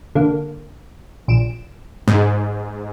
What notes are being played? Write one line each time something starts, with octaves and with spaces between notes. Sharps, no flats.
D3 A#3
A#1 D7 E7
G#2